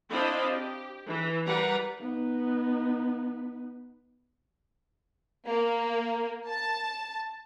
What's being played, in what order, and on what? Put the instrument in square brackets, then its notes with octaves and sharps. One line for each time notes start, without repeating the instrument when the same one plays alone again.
[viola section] C4 D4 E4 D#5 F5 B5
G4
E3
G3 A#4 B4 F#5 A#5
[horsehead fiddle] B3 D#4
[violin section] A#3
A5